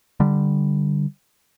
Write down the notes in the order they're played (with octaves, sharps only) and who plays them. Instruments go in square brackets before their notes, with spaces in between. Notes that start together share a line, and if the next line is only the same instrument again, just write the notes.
[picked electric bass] D3 G3